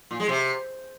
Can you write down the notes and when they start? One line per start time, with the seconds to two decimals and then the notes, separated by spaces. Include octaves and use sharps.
0.11 A#2
0.20 G#3
0.29 C3